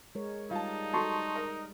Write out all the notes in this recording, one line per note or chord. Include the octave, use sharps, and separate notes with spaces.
G#3 A#4 C#5
G3 D#4 F4 G4 A5
F#3 A4 A5 C6 C#6
A#4 D#5